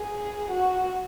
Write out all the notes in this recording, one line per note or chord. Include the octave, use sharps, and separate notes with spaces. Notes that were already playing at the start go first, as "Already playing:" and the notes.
Already playing: G#4
F#4